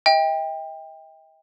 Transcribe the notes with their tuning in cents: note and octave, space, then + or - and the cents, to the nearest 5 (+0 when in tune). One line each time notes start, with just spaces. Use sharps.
D#5 +45 G5 +20